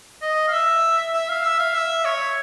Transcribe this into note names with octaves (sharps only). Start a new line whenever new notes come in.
D#5
F5
E5
E5
F5
E5
F5
E5
C#5